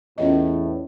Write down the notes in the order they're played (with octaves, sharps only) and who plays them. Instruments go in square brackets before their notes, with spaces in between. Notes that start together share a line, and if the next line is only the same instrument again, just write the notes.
[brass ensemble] E2 A2 [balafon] C#4 F4 D#5